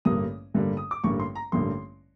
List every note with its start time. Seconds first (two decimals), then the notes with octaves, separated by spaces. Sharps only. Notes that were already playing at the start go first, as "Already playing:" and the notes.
0.05 A1 G2 D3 G3 A#3 D#6
0.54 A1 G2 D3 G3 A#3
0.77 D#6
0.91 D6
1.04 A1 G2 D3 G3 A#3 C#6
1.20 C6
1.35 A#5
1.52 A1 G2 D3 G3 A#3 C6